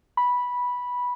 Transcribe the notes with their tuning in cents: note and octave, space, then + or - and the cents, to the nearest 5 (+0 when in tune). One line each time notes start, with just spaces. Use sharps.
B5 -10